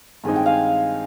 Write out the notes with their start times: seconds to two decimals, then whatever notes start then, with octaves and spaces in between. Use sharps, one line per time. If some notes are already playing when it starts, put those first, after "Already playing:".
0.24 G2 D#3 G#3 C4 D#4 G#5
0.36 G5
0.46 F5 G#5